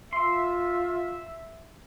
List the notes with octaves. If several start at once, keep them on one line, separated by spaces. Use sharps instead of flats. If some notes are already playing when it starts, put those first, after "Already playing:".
F4 E5 C6